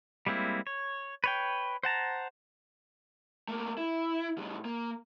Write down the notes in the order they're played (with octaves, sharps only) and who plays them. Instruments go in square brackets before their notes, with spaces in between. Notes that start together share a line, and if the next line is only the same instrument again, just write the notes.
[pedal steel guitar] G3 G#3 A#3 C4 E4
C#5
B4 C#5 G5
C5 F#5 A5 A#5
[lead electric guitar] A3 A#3
E4
A2 G3
A#3